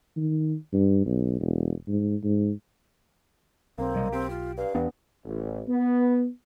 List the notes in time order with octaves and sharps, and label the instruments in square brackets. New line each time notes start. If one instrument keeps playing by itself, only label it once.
[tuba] D#3
G2
B1
E1
G#2
G#2
[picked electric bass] B1 [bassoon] A#3 [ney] C4
[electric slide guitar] C3 G3 D#5
[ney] C4 [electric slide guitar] G4
[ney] F4
[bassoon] G2 [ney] F5
[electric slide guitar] E2 [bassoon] G2 [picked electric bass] B3 D4
[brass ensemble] A1
B3